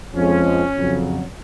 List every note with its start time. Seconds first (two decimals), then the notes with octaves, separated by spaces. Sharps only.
0.14 F2 F3 G#3 C#4
0.75 F2 C#3 F#3